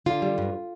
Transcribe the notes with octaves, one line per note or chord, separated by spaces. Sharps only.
D3 F4
G3
G2